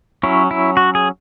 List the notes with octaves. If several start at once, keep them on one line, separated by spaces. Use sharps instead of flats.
F#3 C#4 E4
E4
F#4
G#4